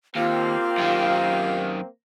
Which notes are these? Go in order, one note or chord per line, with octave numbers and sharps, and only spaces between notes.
D#2 A#3 C4 F4 G4 F5
F#2 D#3